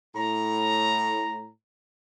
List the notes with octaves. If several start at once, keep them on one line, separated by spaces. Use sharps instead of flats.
A2 A#5